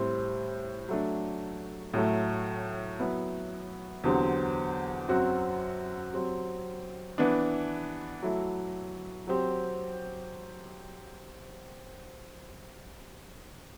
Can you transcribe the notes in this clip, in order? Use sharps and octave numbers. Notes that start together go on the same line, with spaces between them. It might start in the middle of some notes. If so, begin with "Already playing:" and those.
Already playing: A2 G3 C4
F#3 A3 D4
A2 F#3 A3
F#3 B3 E4
E2 D3 F#3 C4 G4
F#2 F#3 C4 F#4
F#3 C4 G4
E3 B3 D4
F#3 A3 E4 A4
F#3 C4 G4